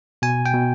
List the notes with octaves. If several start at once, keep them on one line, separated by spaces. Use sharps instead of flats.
B2 G#5
G5
B2